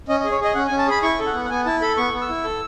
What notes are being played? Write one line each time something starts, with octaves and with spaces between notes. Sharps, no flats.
C#4 D#5
D#5
G#4
C#5
G#4 D#5
C#4 F#5
G#5
C#4
A5
G#4 B5
E4 C#6
A4
F#5
B3
F#5
B3 G#5
E4 A5
A4 B5
B3 C#6
B3
E6
E4
A4